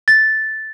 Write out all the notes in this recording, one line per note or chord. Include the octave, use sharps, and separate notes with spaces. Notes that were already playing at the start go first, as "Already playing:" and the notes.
A6